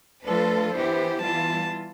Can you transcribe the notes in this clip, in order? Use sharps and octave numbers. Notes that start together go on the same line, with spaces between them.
F3 A3 D4 F4 A4 B4
E3 B3 E4 G4 C5
E3 G3 B3 F4 A5